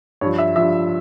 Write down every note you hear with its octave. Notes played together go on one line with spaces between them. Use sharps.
G2 F3 C#5
E5
G2 F3 E5